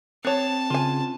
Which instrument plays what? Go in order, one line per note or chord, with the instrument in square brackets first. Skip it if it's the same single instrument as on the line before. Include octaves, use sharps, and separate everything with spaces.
[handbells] C4 [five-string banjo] G#4 C#5 [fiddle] A5
[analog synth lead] C#3 [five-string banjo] F4 G#5